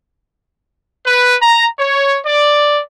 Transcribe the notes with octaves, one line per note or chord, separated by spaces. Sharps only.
B4
A#5
C#5
D5